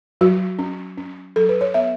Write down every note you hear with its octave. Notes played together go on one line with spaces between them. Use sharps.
F#3 F#4
C#4
C#4
F#3 A4
B4
C#5
B3 E5